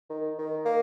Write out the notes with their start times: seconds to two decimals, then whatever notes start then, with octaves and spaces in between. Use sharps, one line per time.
0.10 D#3
0.38 D#3
0.65 A#3